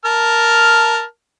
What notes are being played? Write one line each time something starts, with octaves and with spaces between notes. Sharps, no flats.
A#4 A5 F6